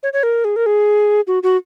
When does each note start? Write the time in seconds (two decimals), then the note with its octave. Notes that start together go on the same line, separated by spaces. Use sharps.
0.03 C#5
0.13 C#5
0.23 A#4
0.45 G#4
0.56 A#4
0.66 G#4
1.27 F#4
1.43 F#4